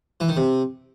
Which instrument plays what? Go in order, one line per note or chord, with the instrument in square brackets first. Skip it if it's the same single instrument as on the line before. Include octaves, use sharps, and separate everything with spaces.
[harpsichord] E3
D#3
C3